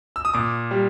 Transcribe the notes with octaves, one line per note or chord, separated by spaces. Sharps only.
E6
D#6
A#2 D6
G3